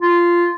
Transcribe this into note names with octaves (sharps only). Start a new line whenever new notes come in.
F4